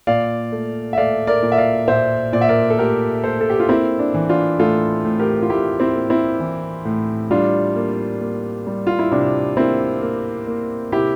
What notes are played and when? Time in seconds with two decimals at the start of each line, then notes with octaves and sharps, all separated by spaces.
0.07 A#2 D5 F5
0.52 A3
0.93 E5
0.97 A3 D5 F5
1.27 A#4 D5
1.42 A#2
1.52 E5
1.58 D5 F5
1.88 A#2 C5 E5
2.33 A#2 D5
2.41 E5
2.49 A#4 D5
2.70 A4
2.78 A3 G4 A#4
3.23 A3 A4 C5
3.41 A4
3.50 G4
3.60 F4
3.69 A#3 C4 E4
3.99 D4
4.14 E3
4.29 D4 F4
4.59 A2 F4 A4
5.05 A2
5.19 G4 A#4
5.42 F4
5.50 A2 E4 G4
5.80 C4 E4
5.95 A#3
6.10 C4 E4
6.40 E3
6.85 A2
7.31 G3 D4 F4
7.76 A#3
8.21 A#3
8.67 G3
8.87 F4
8.99 E4
9.12 C3 D4
9.57 A#3 C4 E4
10.02 A#3
10.47 A#3
10.92 C3 E4 G4